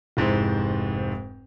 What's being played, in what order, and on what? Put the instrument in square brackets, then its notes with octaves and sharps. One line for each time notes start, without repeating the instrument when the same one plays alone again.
[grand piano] F1 G#2 E4 C5